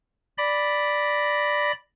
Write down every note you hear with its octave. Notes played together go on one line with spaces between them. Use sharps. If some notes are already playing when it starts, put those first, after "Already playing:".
D5 B5 A#6